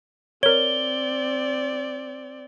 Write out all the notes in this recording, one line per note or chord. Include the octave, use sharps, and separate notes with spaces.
C4 A#4 C#5 D5 G7